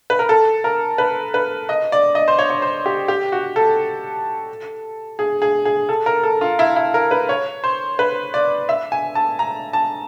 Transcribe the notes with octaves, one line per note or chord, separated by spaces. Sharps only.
B4
A#4
A4
A#4
B4
B4
D#5
D5
D#5
C5
C#5
C#5
C5
G4
G4
F#4
A4
G#4
G#4
G#4
A4
A#4
A4
F4
E4
E4
A#4
B4
C#5
C5
B4
D5
E5
G#5
A5
A#5
A5